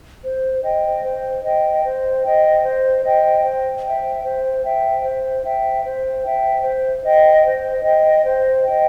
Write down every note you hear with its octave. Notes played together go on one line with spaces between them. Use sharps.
C5
D#5 G5
C5
D#5 G5
C5
D#5 G5
C5
D#5 G5
C5
E5 G5
C5
E5 G5
C5
E5 G5
C5
E5 G5
C5
D#5 G5
C5
D#5 G5
C5
G5
D#5